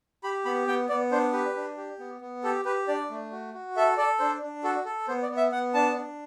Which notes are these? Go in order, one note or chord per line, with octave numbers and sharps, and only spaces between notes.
G4 B5
B3 B5
B3 G5
B3 D5
D4 C5
G4 B4
D4
G4
B3
B3
G4 A4
G4 B4
D4 D5
A3
F#4
F#4
A4 E5
A4 D5
D4 C5
D4
F#4 A4
A4
B3 C5
D5
B3
E5
B3 F#5
D4 A5
D4